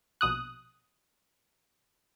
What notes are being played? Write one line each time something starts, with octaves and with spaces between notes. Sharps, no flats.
A#1 B2 D#6 F#6